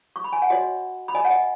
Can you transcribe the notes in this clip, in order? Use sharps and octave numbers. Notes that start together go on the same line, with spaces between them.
C#6
B5
G#5
F#5
F#4 C#5 D#5
B5
D#5 G#5
F#5
D#5